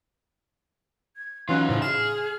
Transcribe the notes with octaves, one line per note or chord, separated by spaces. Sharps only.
G#6
E3 F#3 C#4 D#4 F4 F#6
A2 C#3 C5
G#4 F6 E7